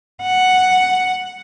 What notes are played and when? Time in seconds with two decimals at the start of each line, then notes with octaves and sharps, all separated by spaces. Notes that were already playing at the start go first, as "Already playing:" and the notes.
0.22 F#5